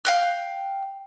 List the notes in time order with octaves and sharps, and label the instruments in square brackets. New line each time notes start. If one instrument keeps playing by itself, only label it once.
[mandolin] F5 G5 F#6